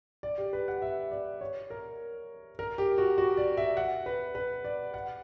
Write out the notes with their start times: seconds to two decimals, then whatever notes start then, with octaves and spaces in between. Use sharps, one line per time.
0.23 D5
0.38 G4
0.53 B4
0.68 F#5
0.82 E5
1.12 D5
1.41 C#5
1.70 A#4
2.59 A#4
2.78 G4
2.98 F#4
3.18 F#4
3.37 D5
3.57 E5
3.77 F#5
4.06 B4
4.35 B4
4.65 D5
4.94 F#5